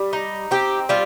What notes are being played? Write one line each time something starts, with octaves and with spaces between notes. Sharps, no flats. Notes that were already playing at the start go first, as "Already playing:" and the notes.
Already playing: G3
D#4
C4 G4
G3 F4